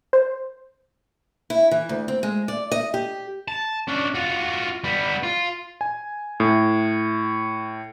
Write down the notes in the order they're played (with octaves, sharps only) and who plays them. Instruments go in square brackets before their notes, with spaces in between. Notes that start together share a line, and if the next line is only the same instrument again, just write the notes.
[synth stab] C5
[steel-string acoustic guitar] E4
E3
D2
C4
G#3
D5
D#5
G4
[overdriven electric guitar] A5
C#4 D4
F4 F#4
G3 B3
F4
[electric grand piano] G#5
A2